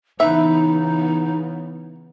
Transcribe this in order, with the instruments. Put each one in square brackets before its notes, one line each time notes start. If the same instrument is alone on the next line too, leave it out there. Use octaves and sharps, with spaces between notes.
[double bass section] C#3 E3 B3 [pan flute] D#4 [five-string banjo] B4 E5